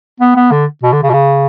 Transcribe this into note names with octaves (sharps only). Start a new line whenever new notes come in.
B3
B3
D3
B2
D3
C#3
B2
C#3